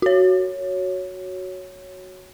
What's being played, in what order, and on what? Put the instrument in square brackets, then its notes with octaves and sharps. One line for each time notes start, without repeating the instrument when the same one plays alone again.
[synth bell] F#4 C#5